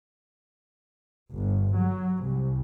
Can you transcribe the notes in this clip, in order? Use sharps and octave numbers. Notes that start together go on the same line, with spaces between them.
G1
F#3
C2